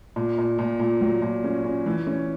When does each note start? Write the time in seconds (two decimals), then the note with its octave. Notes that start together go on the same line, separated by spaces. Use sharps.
0.16 A#2
0.38 A#2
0.59 A#2
0.79 A#2
1.01 F#3
1.22 A#2
1.44 C#4
1.64 C#4
1.86 E3
2.07 C#4